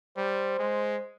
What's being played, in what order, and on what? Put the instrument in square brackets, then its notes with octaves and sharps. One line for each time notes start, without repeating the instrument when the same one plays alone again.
[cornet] G3 [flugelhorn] C5
[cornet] G#3